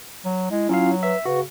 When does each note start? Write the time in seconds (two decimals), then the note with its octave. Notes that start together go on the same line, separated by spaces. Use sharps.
0.25 F#3
0.51 G#3 E4
0.69 F#3 C#4 F4 F5
1.03 B4 E5
1.26 C#3 F#4 B4